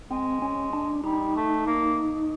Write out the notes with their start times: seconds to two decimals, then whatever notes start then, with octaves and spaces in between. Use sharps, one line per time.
0.11 G#3 C4
0.42 C#4
0.73 D4
1.04 G3 D#4
1.36 A3
1.67 A#3